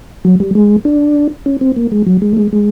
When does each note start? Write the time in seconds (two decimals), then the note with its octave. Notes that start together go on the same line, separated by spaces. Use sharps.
0.25 F#3
0.40 G3
0.55 G#3
0.85 D4
1.46 C#4
1.61 C4
1.77 A#3
1.92 G#3
2.06 F#3
2.22 G#3
2.33 A3
2.37 G#3
2.53 G#3